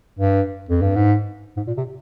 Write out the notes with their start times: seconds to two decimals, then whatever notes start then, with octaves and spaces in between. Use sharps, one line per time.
0.19 G2
0.69 F2
0.82 G2
0.95 G#2
1.57 G#2
1.67 A#2
1.77 C3